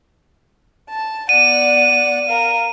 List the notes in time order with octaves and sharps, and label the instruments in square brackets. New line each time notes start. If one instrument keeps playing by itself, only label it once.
[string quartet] A5
[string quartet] B3 D5 F#5 [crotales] D#7
[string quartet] A#4 F5